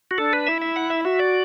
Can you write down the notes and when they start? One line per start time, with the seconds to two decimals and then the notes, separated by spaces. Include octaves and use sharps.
0.11 F#4
0.18 D4 A4
0.33 B4
0.47 E4 E5
0.62 E5
0.76 F#5
0.90 E5
1.05 F#4 E5
1.19 D5